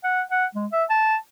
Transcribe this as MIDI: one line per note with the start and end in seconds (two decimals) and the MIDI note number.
0.04 0.22 78
0.31 0.46 78
0.55 0.66 56
0.72 0.84 76
0.90 1.16 81